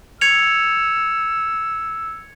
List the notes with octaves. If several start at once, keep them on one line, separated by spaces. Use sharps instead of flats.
E6 G#6 C#7 F7